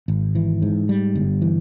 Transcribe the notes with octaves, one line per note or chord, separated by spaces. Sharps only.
G#1
E3
G#2
G3
G1
E3